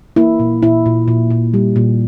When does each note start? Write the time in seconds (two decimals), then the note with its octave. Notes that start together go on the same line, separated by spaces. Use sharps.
0.16 A#3 E4
0.40 A#2
0.62 A#2 E4
0.86 A#2
1.08 A#2
1.30 A#2
1.54 G3
1.76 A#2